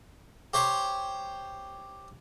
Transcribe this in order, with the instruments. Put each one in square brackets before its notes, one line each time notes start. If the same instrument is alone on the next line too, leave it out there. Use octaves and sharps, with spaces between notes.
[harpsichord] G4 C5 C#5